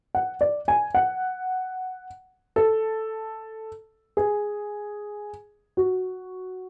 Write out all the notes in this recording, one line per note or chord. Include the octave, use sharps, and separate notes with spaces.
F#5
D5
G#5
F#5
A4
G#4
F#4